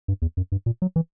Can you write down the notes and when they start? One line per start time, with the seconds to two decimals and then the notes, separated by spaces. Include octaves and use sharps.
0.08 G2
0.22 E2
0.37 F#2
0.52 G2
0.66 A#2
0.82 F#3
0.96 E3